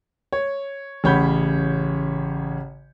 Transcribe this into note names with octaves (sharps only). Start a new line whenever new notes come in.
C#5
A1 C#3 C#5 F#5 B5 G6